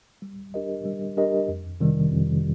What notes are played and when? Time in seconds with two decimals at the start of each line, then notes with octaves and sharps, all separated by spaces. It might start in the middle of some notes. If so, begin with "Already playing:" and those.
0.22 G3
0.54 D4 G4 A#4 D#5
0.85 G3
1.17 D4 G4 A#4 D#5
1.48 F2
1.80 C3 D#3 G3
2.12 F2